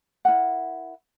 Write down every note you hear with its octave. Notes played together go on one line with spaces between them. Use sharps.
E4 A#4 F#5